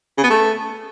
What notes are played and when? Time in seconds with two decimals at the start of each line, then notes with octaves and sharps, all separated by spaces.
0.17 C#3
0.24 B3
0.30 A3